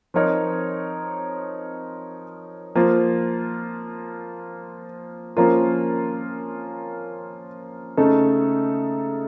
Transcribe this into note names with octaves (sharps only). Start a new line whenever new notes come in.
F3 C4 D#4 A#4 C#5
F3 A#3 F4
F3 A#3 C#4 F4 A#4
C#3 A3 D#4 A4